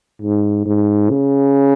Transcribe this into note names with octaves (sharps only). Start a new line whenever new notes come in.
G#2
G#2
C#3